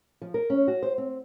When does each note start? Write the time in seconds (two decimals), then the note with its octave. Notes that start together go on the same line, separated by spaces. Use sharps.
0.22 F3
0.34 A#4
0.50 C#4
0.68 F#4
0.83 C5
0.98 C4